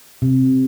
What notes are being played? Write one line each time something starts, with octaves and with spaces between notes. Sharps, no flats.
C3